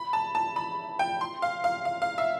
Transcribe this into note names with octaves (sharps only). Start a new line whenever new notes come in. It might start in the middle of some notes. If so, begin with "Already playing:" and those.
Already playing: B5
A5
A5
B5
G5
C6
F5
F5
F5
F5
E5